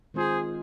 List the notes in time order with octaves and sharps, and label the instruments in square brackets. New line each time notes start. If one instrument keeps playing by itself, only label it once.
[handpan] D#3 G#3 C4 F4 [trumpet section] G#4 C5